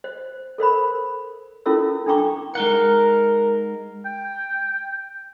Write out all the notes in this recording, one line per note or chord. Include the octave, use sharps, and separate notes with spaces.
C5
A4 A#4 C5 B5
C#4 E4 F4 A4 A#4 E6
D4 A4 G5 A#5 C#6 D6
G#3 D#4 A#4 F#5
G5